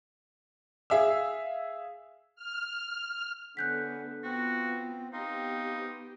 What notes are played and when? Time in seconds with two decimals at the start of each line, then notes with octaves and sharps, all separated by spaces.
0.90 G#4 E5 F5 E6
2.35 F6
3.57 D3 B3 C#4 F#5 F#6 G6 B6
4.24 B3 C4 F4 F#4
5.13 B3 C4 D#4 G4 F5 C6